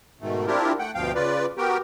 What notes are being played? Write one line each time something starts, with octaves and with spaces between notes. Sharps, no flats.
G#2 B2 D#3 A3
C4 D4 E4 F4 G4 A#4
A3 F#5 G5
D2 G2 B2 F3 F5 G5
C#3 F4 B4 D5
B3 F#4 G4 A#4 G5